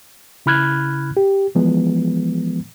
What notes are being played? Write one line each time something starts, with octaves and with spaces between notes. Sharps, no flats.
C#3 E4 B5 F6 F#6 G#6
G4
E3 F3 G#3 B3